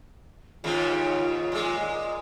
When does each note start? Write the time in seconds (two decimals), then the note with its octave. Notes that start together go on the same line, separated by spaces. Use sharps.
0.64 D#2 G#2 C#3 F4
1.52 A#2 G#3